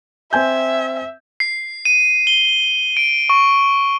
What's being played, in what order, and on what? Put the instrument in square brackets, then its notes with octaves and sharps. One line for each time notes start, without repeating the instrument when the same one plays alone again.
[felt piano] C4 G#5 G6 [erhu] E5
[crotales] C7
D#7
G7
D7
C#6